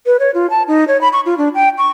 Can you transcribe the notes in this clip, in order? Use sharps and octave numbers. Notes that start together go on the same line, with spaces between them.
B4
C#5
F4
A5
D#4
C#5
B5
C#6
F4
D4
G5
C#6